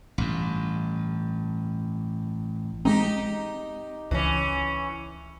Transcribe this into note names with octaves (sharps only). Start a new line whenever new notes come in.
A1 G2
G#3 A3 C4 D#4 G4
C#2 E3 C#4